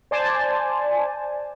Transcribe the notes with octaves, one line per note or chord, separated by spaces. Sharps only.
C5 D5 G#5 A5